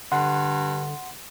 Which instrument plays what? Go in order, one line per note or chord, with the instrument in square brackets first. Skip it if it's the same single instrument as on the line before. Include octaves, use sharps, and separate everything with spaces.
[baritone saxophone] G2 [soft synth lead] D3 [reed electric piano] F#5 C6